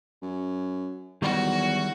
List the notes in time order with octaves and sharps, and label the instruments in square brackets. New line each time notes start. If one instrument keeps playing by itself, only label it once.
[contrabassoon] F#2
[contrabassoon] E2 [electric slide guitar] D#3 F#3 G3 [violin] F#4